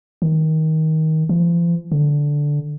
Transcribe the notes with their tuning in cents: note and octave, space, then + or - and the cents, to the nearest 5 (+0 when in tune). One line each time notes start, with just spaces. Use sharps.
D#3 +20
F3 -40
D3 -5